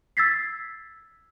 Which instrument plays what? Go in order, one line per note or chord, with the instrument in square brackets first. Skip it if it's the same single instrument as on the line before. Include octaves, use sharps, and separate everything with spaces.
[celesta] E6 G#6 A6 B6 C7